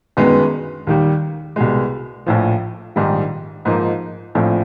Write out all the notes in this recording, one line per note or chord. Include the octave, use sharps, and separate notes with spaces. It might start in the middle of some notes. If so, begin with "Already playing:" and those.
G1 F#2 D#3 G#3 B3
D#2 D#3 G3
C2 B2 G#3
A#1 A2 F3
A#1 G#2 D#3 G3
G#2 F3 A#3 D#4
A#1 A2 F3 A3 C4